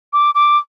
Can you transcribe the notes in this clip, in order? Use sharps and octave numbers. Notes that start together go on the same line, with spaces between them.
D6
D6